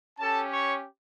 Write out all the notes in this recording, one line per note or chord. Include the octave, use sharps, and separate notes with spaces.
C#4 G4 A4 A5
C#5 C#6